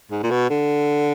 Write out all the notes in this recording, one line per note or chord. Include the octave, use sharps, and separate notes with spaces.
G#2
A#2
B2
D3